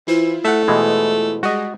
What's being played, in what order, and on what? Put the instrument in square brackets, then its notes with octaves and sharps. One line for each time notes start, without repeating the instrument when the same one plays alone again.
[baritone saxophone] E3 [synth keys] E4 F4 C5
[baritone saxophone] A3 [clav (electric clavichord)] E5 F#5
[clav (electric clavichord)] B2 E3 G#3
[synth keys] G3 G#3 G#4 [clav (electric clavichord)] F#4 D#5